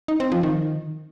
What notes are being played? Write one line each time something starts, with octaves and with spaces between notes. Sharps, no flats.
D#4
C4
F3
D#3